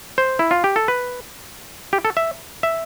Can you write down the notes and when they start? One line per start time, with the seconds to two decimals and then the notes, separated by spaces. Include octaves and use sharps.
0.18 C5
0.39 E4
0.51 F4
0.64 G4
0.76 A4
0.88 B4
1.93 G4
2.05 A4
2.17 E5
2.63 E5